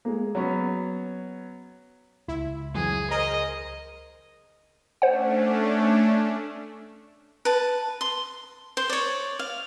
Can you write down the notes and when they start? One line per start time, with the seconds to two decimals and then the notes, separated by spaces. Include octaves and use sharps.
0.05 G#3 A#3
0.35 F#3 B3 C#4
2.28 C#2 E4
2.74 F2 E3 F#3 G#4
3.11 G#4 A#4 C5 D#5
5.02 A3 C#4 D4 C5 F#5
7.45 B4 A5
8.01 C6
8.77 C5 C6
8.90 C#5 D5
9.39 F5